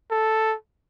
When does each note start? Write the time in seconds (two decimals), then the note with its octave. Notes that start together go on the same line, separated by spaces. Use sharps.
0.11 A4